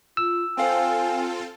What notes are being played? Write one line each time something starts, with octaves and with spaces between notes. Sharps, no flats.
F4 E6
C4 F4 A4 C5 F5 G5 G#5